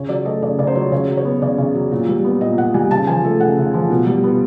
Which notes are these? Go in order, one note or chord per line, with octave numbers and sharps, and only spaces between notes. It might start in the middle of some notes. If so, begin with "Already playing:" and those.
Already playing: C#3 C#5
F#3 D5
A3 D#5
C#3 D5
C#3 D5
C5
F#3 C#5
C#3 C#5
F#3
C#5
B3
C#3 D5
C#3
F#3
A#2
G3
B3
A#2 D#5
A#2 F#5
G3 G#5
C#3 A5
F3 G#5
A3
C#3 F#5
C#3
F3
B2
G3
B3